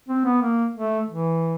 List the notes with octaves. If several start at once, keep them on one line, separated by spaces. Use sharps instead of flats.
C4
B3
A#3
A3
E3